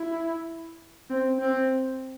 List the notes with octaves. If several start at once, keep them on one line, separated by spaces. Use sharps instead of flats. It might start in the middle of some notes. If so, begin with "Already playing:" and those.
Already playing: E4
C4
C4